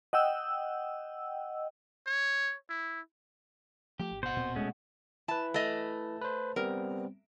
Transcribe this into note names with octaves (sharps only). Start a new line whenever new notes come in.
D#5 F#5 G5 E6
C#5
E4
F3 A3 G4
G#1
B2 C5 F#5
D#1 A#2 C4
G#3 A3 C#4
E4 B4 A5
A3 D#5
B4 C5
G3 B3 C4 A#4